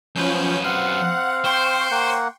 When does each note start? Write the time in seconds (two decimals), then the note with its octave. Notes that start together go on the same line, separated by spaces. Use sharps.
0.16 F#2 F3 C#4 B4 G6
0.64 C4 F5 F#5
1.44 C5 G5 C6 C#6
1.91 A#3 F#5